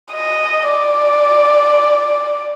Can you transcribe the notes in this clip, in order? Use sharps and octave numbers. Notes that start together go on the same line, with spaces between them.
D#5
D5